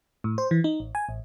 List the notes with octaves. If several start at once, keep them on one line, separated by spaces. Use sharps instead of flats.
A2
C5
E3
D#4
A1
G#5
A1